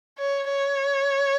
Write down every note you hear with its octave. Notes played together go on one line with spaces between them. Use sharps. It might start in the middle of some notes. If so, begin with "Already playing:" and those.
C#5
C#5